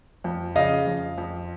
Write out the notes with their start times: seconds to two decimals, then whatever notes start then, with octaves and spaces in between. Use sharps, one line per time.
0.24 F2
0.55 C#3 D#5 F5
0.87 F2
1.18 F2